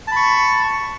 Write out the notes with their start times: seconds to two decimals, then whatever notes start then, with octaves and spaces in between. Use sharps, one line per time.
0.07 A5
0.12 B5
0.16 C#6